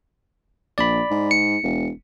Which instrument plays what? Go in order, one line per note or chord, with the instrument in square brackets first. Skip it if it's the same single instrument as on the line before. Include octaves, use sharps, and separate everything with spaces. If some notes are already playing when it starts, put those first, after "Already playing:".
[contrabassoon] A#1 [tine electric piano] D5 B5
[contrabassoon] G#2
[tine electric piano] C#7
[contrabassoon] E1